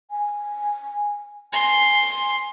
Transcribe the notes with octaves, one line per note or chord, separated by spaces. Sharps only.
G#5
G#5 C6